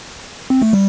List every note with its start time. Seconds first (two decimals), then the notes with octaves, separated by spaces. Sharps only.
0.50 C4
0.62 A3
0.73 G3